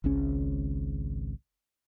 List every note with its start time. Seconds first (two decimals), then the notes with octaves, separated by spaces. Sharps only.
0.04 G#1 C#2 G#2 C#4